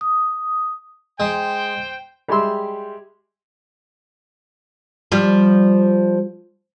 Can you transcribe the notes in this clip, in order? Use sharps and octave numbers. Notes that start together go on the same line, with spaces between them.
D#6
G#3 C5 G5
G3 G#3 G4 E5 C6 E6
F3 G3